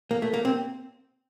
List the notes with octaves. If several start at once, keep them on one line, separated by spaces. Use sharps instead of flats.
A#3
A3
A#3
C4